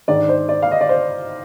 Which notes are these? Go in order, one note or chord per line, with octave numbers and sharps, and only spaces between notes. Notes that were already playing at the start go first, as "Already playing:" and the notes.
G#2 D#3 G#3 D4 D5
C5
D5
F5
D#5
D5
C5